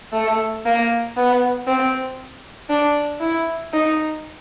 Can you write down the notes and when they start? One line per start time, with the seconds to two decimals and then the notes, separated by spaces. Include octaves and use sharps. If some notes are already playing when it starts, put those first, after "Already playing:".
0.13 A3
0.65 A#3
1.17 B3
1.67 C4
2.69 D4
3.21 E4
3.73 D#4